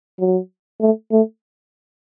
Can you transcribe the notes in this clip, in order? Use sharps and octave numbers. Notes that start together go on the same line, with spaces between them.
F#3
A3
A3